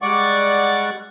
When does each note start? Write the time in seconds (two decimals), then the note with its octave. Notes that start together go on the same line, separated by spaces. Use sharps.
0.02 G3 G#3 D5 F#5 C#6 D6